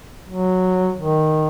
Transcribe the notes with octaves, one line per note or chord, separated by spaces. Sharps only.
F#3
D#3